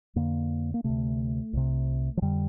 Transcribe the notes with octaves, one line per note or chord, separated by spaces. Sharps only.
F2 D3 A#3
A#3
D2 C3 A3
C2 C3
F3
F2 D3 G3